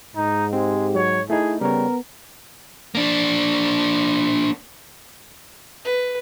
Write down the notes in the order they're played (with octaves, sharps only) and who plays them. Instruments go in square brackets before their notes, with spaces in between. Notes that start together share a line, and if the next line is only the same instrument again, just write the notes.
[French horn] G#2 [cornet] D#4
[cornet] G#3 [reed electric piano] C4 [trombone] G4
[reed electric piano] F#3 [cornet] C#5
[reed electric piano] A3 D#4 [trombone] E4 [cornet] G#4
[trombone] C#3 [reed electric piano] G3 C#5 [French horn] B3 [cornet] A#4
[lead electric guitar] A#3 D4
[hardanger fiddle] B4